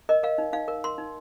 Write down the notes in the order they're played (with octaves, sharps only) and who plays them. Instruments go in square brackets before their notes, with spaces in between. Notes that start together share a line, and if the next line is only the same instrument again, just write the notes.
[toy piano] A#4 D#5
A#4 F5
D#4
D#4 F5
A#4
A#4 C6
D#4